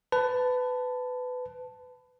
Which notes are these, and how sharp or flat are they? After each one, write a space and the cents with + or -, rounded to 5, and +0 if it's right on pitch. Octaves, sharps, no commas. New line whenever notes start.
B4 +20 A5 +0